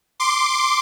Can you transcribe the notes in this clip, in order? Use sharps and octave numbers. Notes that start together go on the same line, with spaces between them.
C6 D6